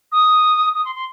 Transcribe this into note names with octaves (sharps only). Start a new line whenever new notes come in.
D#6
D#6
C6
C6